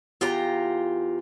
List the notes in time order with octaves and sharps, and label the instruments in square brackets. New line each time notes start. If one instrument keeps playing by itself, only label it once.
[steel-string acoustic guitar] E2 F4 G4 A#5